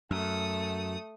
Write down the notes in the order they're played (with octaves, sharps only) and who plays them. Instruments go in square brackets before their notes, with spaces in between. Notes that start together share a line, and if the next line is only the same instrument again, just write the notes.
[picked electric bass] F#2 [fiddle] A3 D#6